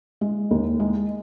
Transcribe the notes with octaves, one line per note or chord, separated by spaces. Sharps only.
G#3
D#2
G#3